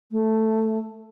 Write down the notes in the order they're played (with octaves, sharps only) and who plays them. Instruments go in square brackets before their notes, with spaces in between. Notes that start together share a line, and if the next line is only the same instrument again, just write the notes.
[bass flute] A3